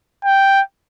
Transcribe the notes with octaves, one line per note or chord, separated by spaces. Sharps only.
G5